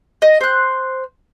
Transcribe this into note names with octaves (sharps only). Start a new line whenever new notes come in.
D#5
C5 F#6